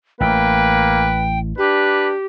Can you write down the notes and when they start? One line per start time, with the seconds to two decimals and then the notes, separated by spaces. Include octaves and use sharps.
0.21 A1 A#3 B4 G5
1.58 D4 G4 B4